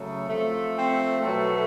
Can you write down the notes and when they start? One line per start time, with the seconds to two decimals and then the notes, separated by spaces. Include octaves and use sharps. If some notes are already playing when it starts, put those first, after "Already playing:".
Already playing: C#3 F#3 A3
0.28 C3 F3 A3
0.76 C4
1.22 B2 F#3 A3